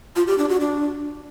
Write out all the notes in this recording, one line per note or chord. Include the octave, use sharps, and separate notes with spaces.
F4
G4
D4
F#4
D4